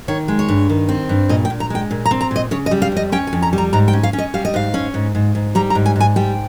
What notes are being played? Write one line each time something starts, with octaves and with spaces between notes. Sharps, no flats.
D#3 C#5
G#3
C#5
G2
D#3
C4
G2
A#2 D#5
G5
A#2
A#5
G#3 G5
A#2
A#5
C4
A#5
A#2 D#5
C#3 C#5
D#5
G3
F5
F2 D#5
C#4 G5
G#5
F2
A#5
G3
A#5
G#2 A#5
G5
C#4
F5
C#4
D#5
G3 F5
D#5
G#2 F5
C#4
G#2
G#2
G#2
G3 A#5
A#5
G#2
G#5
G#2 G#5
G3 G5